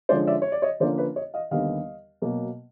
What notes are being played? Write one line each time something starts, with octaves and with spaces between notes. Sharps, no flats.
D3 F3 G#3 C#4 C5 D5
D5 E5
C#5
D5
C#5 D#5
D3 F3 A#3 C#4 C5 D5
B4 C#5
C#5 D#5
D#5 F5
D#2 D3 G3 B3 D#5 F5
B2 F#3 A#3